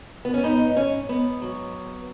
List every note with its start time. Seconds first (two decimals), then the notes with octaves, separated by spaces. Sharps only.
0.25 B3
0.34 C#4
0.43 G#2 B3 D#4
0.76 G#2 C#4
1.09 G#2 B3
1.42 F#3